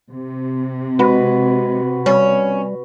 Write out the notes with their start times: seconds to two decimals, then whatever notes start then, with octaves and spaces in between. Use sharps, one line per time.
0.10 C3
0.99 G#3 F#4 B4
2.06 G3 C#4